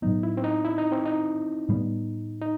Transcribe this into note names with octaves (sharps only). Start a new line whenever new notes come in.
A2 F#3 B3 D#4
E4
C4
D#4
E4
D#4
C4
D#4
A2 G3 B3
D#4